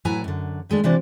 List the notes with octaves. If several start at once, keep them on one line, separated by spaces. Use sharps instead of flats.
A2 F#3 E4 B4 G#5 A#5
F#2 D3
D#3 G#3 A3 D4
C3 E3 C4 D4 F#4 D5